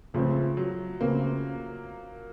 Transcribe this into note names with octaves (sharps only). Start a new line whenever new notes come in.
C#2 C#3 F3 A3 C4
F#3
C#2 C#3 A3 A#3 C4